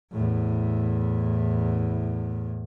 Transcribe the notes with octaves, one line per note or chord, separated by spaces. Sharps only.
E2 A2